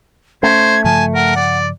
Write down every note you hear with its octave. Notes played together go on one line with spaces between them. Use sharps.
A3 C#4 C5 G#6
G2 C#3 F3 G#5 A5
A#4 F#5
D5